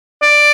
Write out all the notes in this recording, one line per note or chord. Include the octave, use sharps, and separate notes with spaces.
D5